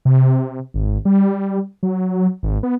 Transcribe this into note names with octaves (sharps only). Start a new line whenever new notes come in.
C3
G#1
G3
F#3
G#1
B3